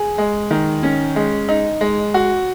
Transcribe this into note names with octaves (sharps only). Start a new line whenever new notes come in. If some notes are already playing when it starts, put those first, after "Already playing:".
Already playing: G#4
G#3
D#3
C#4
G#3
D#4
G#3
F#4